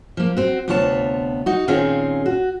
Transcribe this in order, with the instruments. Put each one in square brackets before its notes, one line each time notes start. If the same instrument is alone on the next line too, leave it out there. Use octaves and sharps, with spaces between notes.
[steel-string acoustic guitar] F3 A#3
C4 F#4
D2 C3 B3 F4 C#5 A5
D#4 F#4
A#2 D#3 C4 C#4 F4 G#4
F#4